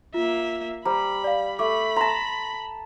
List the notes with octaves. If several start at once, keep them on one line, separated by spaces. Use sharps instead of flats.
A#3 F4 E5
G3 C5 A#5 B5
D5 F5
A3 B5 D6
A5 A#5 C6 A#6